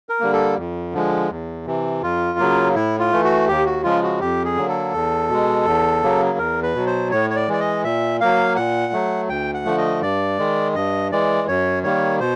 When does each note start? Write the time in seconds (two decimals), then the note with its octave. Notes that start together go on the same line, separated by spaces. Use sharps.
0.09 A#4
0.20 D3 G3 A#3
0.33 A4
0.57 F2
0.93 D3 F3 G#3
1.30 E2
1.66 C3 E3
2.02 F2 F4
2.39 C#3 F#3 A#3
2.75 A2 E4
2.99 F4
3.12 E3 A3
3.24 F#4
3.48 D#2 G4
3.65 F#4
3.84 C#3 F3 G#3 F4
4.03 F#4
4.21 F2 G4
4.45 G#4
4.57 D3 F#3 A#3
4.69 A4
4.94 E2
5.29 B2 G#3
5.66 E2
6.03 C#3 F#3 A#3
6.38 E2 A#4
6.63 B4
6.75 B2 F#3
6.87 C5
7.11 A2 C#5
7.30 C#5
7.36 D5
7.48 E3 G#3 D5
7.60 D#5
7.84 A#2 E5
8.21 F#3 A#3 F5
8.56 A#2 F#5
8.93 F#3 A3
9.29 D2 G5
9.54 F#5
9.65 D3 F3 A3
9.78 D#5
10.01 G2 D5
10.39 D#3 G#3
10.75 G2 D#5
11.12 E3 G#3 D5
11.48 F#2 C#5
11.83 D#3 G3 A#3 C#5
12.20 B2 C5